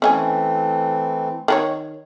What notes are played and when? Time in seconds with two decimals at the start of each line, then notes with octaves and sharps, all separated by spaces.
0.02 E3 A3 C4 C#4 E5 G#5
1.48 D#3 F#4 C#5